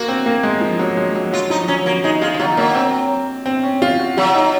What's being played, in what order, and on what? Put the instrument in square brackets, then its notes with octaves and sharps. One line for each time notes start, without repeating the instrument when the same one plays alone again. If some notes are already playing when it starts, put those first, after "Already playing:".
Already playing: [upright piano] A#3 [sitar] F#4
[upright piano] C4
A#3
G#3
F3
F#3
G#3
F#3
[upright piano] F#3 [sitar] F4
[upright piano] F3 [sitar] D#4
[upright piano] F#3 [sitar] C#4
[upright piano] F#3 [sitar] A#3
[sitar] G#3 [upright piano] D#4
[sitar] G#3 [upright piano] F4
[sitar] F3
[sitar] F#3 [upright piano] F4
[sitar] F#3 [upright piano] A#3
[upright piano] C4
C4
C#4
F4
F#4
[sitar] F#3 [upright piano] F4
[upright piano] D#4